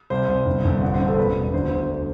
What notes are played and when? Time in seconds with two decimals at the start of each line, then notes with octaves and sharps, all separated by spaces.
0.10 C2 C5
0.28 C2
0.46 G1
0.65 G1
0.81 A1 F#5
0.94 C5
0.99 A1
1.06 A4
1.17 E1 B4
1.35 E1
1.54 D2 C5
1.71 D2